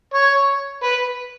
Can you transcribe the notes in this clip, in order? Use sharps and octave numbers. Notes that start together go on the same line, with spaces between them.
C#5
B4